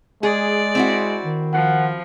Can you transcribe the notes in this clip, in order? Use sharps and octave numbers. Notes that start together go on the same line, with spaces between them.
G#3 G#4 D5
C4 E4 F#4
D#3
F3 F#5